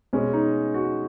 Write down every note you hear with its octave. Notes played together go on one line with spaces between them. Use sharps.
B2 G#3 C#4
D#4
F#4